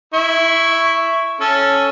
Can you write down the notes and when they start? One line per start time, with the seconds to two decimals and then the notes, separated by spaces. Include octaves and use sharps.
0.14 E4 C#6
1.41 C#4 A4